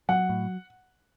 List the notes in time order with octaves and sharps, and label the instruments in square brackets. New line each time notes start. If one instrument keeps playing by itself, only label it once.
[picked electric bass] F#3 [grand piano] F#5
[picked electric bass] A2